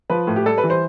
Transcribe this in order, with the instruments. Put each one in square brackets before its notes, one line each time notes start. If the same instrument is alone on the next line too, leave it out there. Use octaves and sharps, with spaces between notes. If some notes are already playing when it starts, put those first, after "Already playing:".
[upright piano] F3 B4
A2
G4
G3 A4
B4
E3
C5